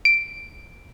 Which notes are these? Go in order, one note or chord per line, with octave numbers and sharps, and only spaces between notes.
D7